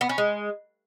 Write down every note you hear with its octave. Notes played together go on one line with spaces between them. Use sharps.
B3
C#4
G#3